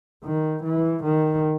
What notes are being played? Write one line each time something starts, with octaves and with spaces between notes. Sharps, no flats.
D#3
E3
D#3